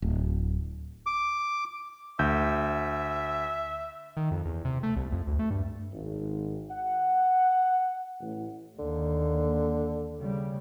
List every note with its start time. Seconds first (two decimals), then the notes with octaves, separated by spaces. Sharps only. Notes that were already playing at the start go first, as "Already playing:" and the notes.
0.02 D1
1.06 D6
2.19 D2 E5 G6
4.17 D#3
4.31 F2
4.45 E2
4.65 C3
4.83 A3
4.96 C2
5.12 F2
5.27 D2
5.39 A3
5.51 G2
5.93 G#1
6.71 F#5
8.21 A1
8.79 D#2 D3 A#3
10.20 C#3 G3